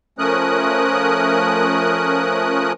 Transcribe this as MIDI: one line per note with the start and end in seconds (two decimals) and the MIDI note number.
0.19 2.72 53
0.19 2.72 57
0.19 2.72 61
0.19 2.72 70
0.19 2.72 87
0.19 2.72 90